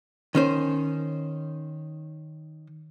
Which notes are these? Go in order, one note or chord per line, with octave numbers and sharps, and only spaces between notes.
D#3 C#4 C5